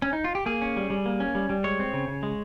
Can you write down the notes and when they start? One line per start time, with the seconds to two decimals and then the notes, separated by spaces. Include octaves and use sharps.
0.02 C#4
0.13 D#4
0.24 F4
0.35 G4
0.46 A#3 G#4
0.62 C#4
0.76 G3
0.90 G3
1.06 A#3
1.20 C#4
1.35 G3
1.50 G3
1.64 G#3 C#5
1.79 C4
1.94 C#3
2.08 C#3
2.23 G#3